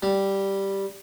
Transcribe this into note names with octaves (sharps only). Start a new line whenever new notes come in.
G3